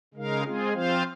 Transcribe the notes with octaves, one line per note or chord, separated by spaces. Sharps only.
C#3 G#3 D#4 A#4 F5
G#3 C4 F4 G#4
F3 C4 F4 C5 F5